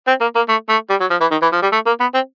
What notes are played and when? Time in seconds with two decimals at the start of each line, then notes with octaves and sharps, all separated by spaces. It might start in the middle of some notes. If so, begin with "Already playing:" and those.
0.07 C4
0.21 A#3
0.35 A#3
0.49 A3
0.69 A3
0.90 G3
1.00 F#3
1.10 F3
1.21 E3
1.31 D#3
1.42 E3
1.52 F3
1.62 G3
1.72 A3
1.86 A#3
2.00 B3
2.14 C4